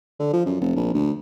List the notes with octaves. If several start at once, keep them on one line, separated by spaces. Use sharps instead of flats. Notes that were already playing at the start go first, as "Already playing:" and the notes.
D3
F3
F#2
F1
A#1
D2